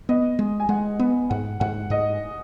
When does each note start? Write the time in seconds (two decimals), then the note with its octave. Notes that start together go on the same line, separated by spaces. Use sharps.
0.09 B3 D#5
0.39 G#3
0.60 G#5
0.69 G#3 F#5
0.99 B3
1.30 G#2 F#5
1.60 G#2 F#5
1.90 G#2 D#5